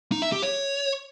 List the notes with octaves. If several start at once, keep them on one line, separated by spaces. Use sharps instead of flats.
D#4
E5
G4
C#5